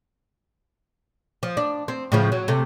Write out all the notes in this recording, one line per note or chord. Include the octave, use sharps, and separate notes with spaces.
F3
D4
C4
A2 C#3 F3
F#3
C3 A3